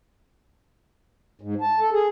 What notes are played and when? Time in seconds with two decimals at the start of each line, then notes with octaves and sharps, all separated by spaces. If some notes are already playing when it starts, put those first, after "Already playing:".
1.41 G#2
1.61 A5
1.80 A4
1.93 G#4